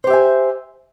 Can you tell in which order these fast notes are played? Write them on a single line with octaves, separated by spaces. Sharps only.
C5 G4 E5 G#5